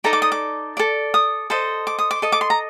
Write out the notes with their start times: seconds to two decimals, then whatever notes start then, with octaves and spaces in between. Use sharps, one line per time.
0.04 D#4 A4 D5 A#5
0.13 D6
0.22 D#6
0.32 D6
0.77 A4 D5
1.14 D#6
1.50 A4 C5 D#5
1.87 D6
1.99 D#6
2.11 D6
2.22 A4 D#5
2.32 D6
2.41 C6
2.50 A#5